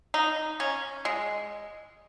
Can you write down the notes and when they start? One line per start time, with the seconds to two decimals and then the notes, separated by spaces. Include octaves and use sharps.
0.14 D#4
0.60 C#4
1.05 G#3